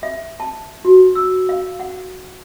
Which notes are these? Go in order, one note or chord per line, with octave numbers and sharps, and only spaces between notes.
E5
A5
F#4
E6
F5
F#5